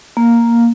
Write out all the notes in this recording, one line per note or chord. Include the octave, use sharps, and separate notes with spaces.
A#3